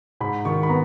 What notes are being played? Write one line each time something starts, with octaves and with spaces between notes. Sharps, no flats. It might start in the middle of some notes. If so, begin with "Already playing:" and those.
G#2 B5
D#3 C#6
B5
B3 A#5